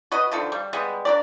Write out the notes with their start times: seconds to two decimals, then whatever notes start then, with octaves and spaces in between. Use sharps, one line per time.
0.12 F#4 B4 D#5
0.32 D3 D#3 F3 A4
0.52 G3
0.73 G3 G#3 B3
1.05 D4 A#4 D5